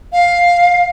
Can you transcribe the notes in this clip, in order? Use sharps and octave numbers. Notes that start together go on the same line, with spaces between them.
F5